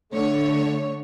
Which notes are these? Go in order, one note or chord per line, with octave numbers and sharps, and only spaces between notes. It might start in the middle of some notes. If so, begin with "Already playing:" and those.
D3 A3 C#5